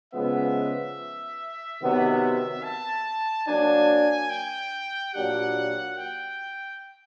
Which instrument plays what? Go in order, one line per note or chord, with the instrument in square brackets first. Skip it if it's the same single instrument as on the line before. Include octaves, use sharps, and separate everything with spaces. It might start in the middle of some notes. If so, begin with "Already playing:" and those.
[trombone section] C#3 F3 G#3 B3 [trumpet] E5
[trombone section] C3 D#3 F#3 B3
[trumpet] A5
[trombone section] F#3 A#3 D4 [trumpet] G#5
[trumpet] G5
[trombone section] A#2 F#3 A#3 D4 G4 [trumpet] F#5
[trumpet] G5